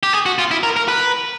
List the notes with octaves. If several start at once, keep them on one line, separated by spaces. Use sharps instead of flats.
G4
G#4
F#4
F4
E4
A#4
A#4
B4